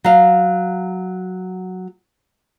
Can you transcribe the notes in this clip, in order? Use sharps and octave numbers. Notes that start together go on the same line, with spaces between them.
F#3 F5